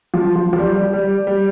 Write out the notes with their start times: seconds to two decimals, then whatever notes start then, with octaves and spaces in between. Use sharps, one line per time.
0.14 F3
0.36 F3
0.53 F3
0.58 G3
0.76 G3
0.93 G3
1.27 G3